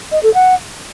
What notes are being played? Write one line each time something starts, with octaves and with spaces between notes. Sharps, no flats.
D#5
A4
F#5